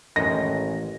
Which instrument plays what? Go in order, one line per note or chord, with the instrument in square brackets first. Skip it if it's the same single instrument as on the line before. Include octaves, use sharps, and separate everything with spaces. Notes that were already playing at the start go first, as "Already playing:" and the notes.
[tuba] A1 [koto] D#3 G#3 [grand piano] A#6